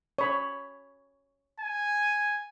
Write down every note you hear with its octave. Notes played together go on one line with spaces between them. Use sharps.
C#5 B5
G#5